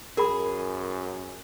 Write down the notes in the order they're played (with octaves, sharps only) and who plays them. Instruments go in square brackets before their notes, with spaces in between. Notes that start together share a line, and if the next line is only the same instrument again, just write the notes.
[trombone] F#2 [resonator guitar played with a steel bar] G#4 [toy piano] A#4 B5